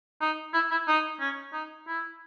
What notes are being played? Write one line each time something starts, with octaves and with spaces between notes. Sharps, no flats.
D#4
E4
E4
D#4
C#4
D#4
E4